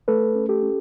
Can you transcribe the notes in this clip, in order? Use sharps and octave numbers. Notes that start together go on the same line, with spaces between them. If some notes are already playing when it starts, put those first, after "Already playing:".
A3 A4 B4
C#4
G4 A4
C#4